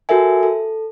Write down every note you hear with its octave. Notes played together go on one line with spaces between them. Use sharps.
F#4 A4 A#4 E5 G#5
A4